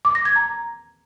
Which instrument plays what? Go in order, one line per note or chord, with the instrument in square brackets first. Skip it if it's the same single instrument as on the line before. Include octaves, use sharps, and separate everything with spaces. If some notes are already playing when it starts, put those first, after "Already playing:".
[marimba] D6
A#6
G#6
A#5